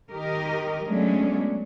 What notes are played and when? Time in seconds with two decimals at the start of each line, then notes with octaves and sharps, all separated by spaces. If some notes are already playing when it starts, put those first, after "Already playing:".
0.11 D#3 G4 A#4 D#5
0.86 F#3 G#3 A3 B3 C#4 D4